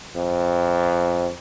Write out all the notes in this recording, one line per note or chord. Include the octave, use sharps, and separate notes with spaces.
F2